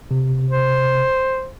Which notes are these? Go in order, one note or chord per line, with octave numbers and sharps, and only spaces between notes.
C3
C5